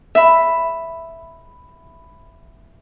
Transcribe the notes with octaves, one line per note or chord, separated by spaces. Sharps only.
E5 B5